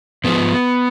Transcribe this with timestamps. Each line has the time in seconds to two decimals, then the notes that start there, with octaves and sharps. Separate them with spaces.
0.24 G#2 F3 B3